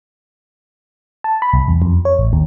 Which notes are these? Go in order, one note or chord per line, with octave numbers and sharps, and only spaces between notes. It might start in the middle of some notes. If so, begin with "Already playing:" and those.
A5
B5
C2
E2
F2
C#5
A1
D#2